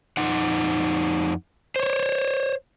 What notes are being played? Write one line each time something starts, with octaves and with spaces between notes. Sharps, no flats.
F2 D#4 F#5
C5 C#5